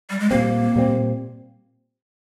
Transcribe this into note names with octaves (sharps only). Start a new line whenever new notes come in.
G3
G#3
A#2 G3 A#3 C4
A#2 G3 C4